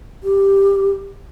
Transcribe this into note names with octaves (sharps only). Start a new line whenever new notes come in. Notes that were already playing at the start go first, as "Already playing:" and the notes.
G4